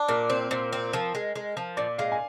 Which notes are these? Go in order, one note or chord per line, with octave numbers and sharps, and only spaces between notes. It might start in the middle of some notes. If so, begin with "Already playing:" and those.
Already playing: D4
A#2 A#4
C4 C5
A#2 C5
C4 C5
F3 A#4
G#3
G#3
F3
A#2 D5
G#3 F5
G#5